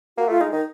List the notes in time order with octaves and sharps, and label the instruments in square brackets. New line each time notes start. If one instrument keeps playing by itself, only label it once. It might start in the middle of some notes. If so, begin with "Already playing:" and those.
[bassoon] A#3 [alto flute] F#4
[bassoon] A3 [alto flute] F4
[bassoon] G#3 [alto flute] D#4
[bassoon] D#3 [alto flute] D#4